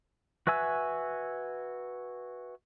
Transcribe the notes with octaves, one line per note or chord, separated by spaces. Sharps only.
F#4 B4 E5 G#5 E6